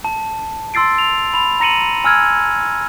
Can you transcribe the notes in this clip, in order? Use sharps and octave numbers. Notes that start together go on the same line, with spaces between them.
A5
C6 E6 A6 C7 D7
F7
B5 F7
A#5 A#6 C#7 D#7 F#7
G#5 E6 F6 G#6